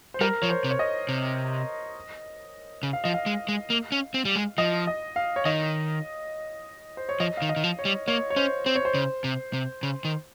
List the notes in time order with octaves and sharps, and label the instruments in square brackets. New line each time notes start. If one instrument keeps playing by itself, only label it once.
[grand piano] C5
[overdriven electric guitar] G3 [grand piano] A#4
[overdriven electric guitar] F3 [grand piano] C#5
[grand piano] C5
[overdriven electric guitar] C3
[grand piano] C#5
D#5
[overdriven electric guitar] C3
C#3
[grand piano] F5
[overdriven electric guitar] F3 [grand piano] D#5
[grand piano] F5
[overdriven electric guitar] G#3
G#3
A#3
C#4
C4
G3
G#3
[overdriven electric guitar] F3 [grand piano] D#5
[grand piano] D#5
F5
C#5
[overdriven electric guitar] D#3 [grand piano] D#5
[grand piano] C5
C#5
[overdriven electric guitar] F3 [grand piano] D#5
[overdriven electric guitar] D#3 [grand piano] F5
[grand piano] D#5
[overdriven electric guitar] D#3
F3
[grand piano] C#5
[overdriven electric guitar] G3
[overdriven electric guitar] A#3 [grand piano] C#5
[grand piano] C#5
[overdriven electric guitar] C#4 [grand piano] C5
[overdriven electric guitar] C4 [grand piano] C5
[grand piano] C#5
C5
[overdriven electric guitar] C#3
C3
C3
C#3
D#3